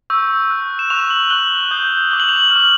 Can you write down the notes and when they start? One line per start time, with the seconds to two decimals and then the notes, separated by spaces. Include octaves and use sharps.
0.10 C#6 E6 G6
0.50 C#6 F#6
0.79 E7
0.90 C#6 F#6 F7
1.10 F#7
1.30 C#6 F#6 G7
1.71 D#6 G6
2.11 D6 G6 G7
2.20 F#7
2.29 F7
2.36 F#7
2.51 F6
2.56 D6